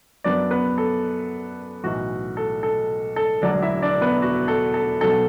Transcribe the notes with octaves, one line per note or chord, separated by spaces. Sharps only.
F#2 F#3 B3 D4 D5
B3 B4
A4
B1 A2 E3 F#4
A4
A4
A4
E1 D2 D3 F#3 D4 D5
E4 E5
D4 D5
B3 B4
F#4
A4
A4
B1 B2 F#3 A4